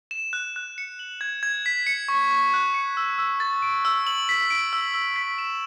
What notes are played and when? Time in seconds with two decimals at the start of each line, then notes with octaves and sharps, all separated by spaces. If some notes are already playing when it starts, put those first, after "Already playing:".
0.11 E7
0.33 F#6
0.56 F#6
0.78 C#7
0.99 F#7
1.21 G#6
1.43 G#6
1.66 B6
1.87 C#7
2.08 C#6
2.31 C#6
2.54 F#6
2.74 C#7
2.97 E6
3.18 E6
3.40 A6
3.62 D7
3.85 E6
4.07 F#7
4.29 B6
4.50 D7
4.73 E6
4.94 E6
5.16 B6
5.38 E7